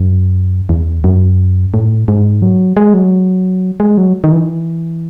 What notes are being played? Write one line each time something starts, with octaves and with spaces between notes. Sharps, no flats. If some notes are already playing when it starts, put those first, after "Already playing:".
Already playing: F#2
E2
F#2
A2
G#2
F#3
G#3
F#3
G#3
F#3
D#3
E3